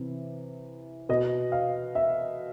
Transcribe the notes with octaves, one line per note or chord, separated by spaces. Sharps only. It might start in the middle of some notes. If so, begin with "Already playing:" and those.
Already playing: C3 E3
B2 D#5
F5
E5